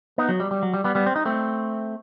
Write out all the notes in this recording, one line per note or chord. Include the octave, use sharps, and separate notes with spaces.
B3 D#4
F#3
G3
G3
F#3
G3
G3 B3
G3 B3
C4
D#4
A3 C4